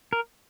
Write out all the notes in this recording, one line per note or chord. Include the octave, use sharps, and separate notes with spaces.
A#4